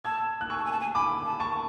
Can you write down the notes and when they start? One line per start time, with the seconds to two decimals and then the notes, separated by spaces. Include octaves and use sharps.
0.05 A5 E6 G#6
0.41 F#6
0.50 G#5 C#6 E6
0.57 A5
0.65 G#5
0.72 A5
0.80 G#5
0.95 G#5 B5 D6
1.25 A5
1.40 A5 C#6